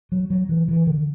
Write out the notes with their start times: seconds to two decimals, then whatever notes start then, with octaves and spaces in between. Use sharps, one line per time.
0.12 F#3
0.30 F#3
0.49 E3
0.68 E3
0.87 D3